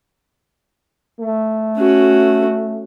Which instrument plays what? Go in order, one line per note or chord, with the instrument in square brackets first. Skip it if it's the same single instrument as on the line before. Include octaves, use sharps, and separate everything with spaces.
[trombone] A3
[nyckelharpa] C#4 F#4